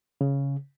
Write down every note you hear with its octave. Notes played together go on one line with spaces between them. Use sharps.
C#3